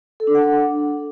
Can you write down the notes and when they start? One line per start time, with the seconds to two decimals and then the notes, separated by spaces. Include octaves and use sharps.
0.20 A4
0.27 D4
0.35 F#5
0.42 D4